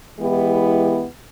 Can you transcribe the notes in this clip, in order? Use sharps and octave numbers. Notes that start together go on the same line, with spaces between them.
E3 G#3 B3 E4 G4